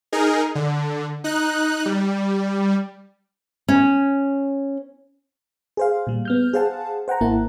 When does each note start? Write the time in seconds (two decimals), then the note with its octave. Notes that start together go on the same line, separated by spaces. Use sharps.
0.12 D#4 G#4 A#4
0.55 D3
1.24 D#4 F#6
1.86 G3
3.68 C#4
5.77 G#4 C5 F5
6.07 A#2 G3
6.25 B3 F6 G6
6.53 G#4 C5 F5 F#5 A5
7.08 C5 F#5 G5 A#5
7.21 G#1 A#3 E4 F#5 A5